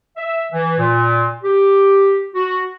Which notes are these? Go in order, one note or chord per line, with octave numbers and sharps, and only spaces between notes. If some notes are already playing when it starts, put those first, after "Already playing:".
E5
E3
A#2
G4
F#4